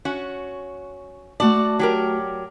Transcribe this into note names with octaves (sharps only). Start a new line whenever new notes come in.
C#4 F#4
A3 F#4 D5 A5
F#3 G4 A#4